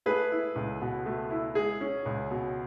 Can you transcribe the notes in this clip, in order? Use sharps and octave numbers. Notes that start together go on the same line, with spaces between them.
A3 G#4 B4
E4
C#2
B2
A3
E4
G#3 G#4
C#4
C#2
B2